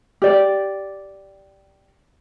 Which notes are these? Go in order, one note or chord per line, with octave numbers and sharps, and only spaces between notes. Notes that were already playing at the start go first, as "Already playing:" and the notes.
G4 D5